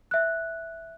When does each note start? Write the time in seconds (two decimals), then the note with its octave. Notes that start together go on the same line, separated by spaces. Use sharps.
0.11 E5 F#6